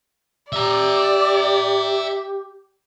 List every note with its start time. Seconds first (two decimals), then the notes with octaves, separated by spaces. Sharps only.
0.53 G4 D5 E5 A#5